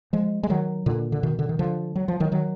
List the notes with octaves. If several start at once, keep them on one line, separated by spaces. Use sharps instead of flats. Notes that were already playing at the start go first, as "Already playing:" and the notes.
F3 G#3
G#3
D#3 F#3
A#2 D3
D3
B2 D#3
D3
D#3
D3 F3
F#3
F3
D#3 F#3
D#3 F#3